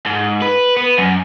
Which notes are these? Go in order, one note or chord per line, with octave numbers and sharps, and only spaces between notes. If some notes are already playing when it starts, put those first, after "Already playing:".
G#2
B4
B3
F#2